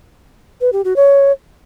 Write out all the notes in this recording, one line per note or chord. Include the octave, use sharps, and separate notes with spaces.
B4
G4
F#4
C#5